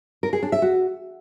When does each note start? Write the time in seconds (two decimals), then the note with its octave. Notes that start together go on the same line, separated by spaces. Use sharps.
0.23 A#4
0.33 G#4
0.43 D4
0.52 E5
0.62 F#4